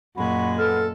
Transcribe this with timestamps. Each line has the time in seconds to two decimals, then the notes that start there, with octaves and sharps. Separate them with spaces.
0.16 F#2 A#2 G#3 F#4 B5
0.57 B3 A4 F6